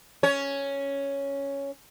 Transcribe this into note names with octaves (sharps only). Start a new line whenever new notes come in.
C#4 C#5